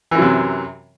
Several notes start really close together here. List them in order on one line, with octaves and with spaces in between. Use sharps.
E3 F#2 F#3 C3